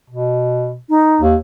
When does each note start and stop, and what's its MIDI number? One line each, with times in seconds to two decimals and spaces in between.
0.10 0.78 47
0.89 1.21 63
1.21 1.36 39